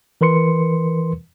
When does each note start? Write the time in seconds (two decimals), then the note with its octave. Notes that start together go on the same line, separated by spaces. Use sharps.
0.21 E3 A#4 B4 C6 C#7